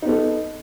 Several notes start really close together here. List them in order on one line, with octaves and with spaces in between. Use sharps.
D#4 B3 A4